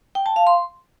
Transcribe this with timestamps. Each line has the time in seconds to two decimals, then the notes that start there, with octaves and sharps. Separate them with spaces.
0.15 G5
0.26 A5
0.36 F5
0.47 C6